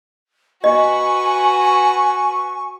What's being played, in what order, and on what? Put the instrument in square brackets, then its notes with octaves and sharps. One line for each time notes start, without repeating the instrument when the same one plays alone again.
[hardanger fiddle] F#4 B4 [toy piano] D#5 [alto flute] G#5 [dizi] C#6